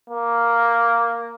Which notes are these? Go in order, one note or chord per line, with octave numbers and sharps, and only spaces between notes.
A#3